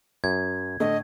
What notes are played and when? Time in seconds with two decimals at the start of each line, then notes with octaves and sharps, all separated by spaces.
0.24 F#2 G#6
0.80 A2 D3 A3 D#5